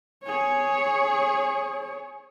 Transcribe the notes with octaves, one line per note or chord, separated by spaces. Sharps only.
G#4 C#5